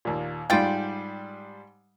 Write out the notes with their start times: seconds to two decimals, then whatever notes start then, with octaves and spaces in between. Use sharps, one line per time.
0.05 D#2 A#2
0.50 G#2 G3 F4 G5